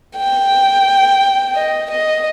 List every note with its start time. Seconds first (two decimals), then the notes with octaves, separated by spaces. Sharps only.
0.17 G5
1.55 D#5
1.90 D#5